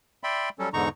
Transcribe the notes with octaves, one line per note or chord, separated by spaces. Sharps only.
D5 E5 G5 B5 C6
F#3 G3 C#4 A4
E2 G#2 D3 D#4 A#5 C#6